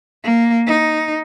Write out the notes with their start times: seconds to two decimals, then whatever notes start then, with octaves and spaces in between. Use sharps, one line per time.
0.24 A#3
0.67 D#4